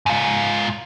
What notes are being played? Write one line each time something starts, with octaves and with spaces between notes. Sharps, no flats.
G#2 F4